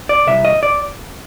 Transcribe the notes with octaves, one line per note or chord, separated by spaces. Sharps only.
D5
C2 C3 E5
D#5
D5